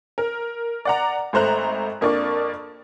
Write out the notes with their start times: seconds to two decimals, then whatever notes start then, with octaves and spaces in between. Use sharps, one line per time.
0.18 A#4
0.85 D5 F#5 A#5
1.33 G#1 A3 C5 A#5 F#6
2.01 F2 A#3 D4 D5 C#6